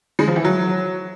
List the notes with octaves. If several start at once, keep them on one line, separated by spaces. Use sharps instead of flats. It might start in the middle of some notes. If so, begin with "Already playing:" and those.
G#3
F3
E3
F#3